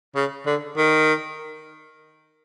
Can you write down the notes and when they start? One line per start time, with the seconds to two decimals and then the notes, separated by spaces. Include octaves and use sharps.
0.16 C#3
0.46 D3
0.77 D#3